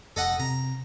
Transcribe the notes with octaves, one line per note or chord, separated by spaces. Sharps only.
F1 A4 D#5 F#5
C3 A#5